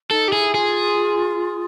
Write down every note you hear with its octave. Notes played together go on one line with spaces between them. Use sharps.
D#4 A4
G4
E4 G#4
F4 G#4